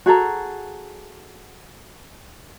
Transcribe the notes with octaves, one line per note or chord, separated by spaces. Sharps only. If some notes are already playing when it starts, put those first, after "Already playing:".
F#4 G#4 A4 A#5